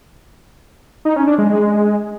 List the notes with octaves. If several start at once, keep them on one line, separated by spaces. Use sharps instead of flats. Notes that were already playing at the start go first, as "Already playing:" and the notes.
D#4
C#4
D4
G#3
G#3